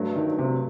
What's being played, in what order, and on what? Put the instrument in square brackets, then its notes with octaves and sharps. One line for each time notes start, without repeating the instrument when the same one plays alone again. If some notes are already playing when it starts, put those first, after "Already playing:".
Already playing: [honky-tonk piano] G2 F#3 A3
[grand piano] D#3
C3